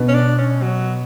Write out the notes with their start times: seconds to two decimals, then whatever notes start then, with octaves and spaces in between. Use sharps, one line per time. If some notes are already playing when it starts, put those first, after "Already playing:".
Already playing: B2 B3
0.09 C#4
0.14 D4
0.38 C#4
0.62 F#3